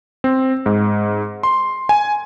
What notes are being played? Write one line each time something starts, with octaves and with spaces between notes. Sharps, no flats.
C4
G#2
C6
G#5